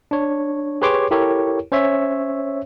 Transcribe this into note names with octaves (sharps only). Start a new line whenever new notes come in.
D4 C#5
G4 G#4 B4 C#5 C6 D6
E4 G4 A4 A#4 C#5
C#4 C5 C#5 E5